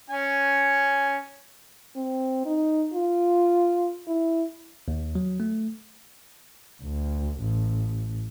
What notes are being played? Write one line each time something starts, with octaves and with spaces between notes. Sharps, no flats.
C#4 G#5
C4
D#4
F4
E4
D#2
F#3
A3
D2
A1